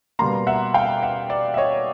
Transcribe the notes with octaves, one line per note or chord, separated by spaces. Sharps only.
B2 G3 A#3 A#5 C6
E5 F#5
F5 G5
E5 F#5
D5 E5
E5
C#5 D#5